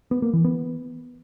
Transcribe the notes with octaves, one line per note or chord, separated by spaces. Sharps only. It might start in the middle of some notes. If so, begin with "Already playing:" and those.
B3
A#3
E3
B3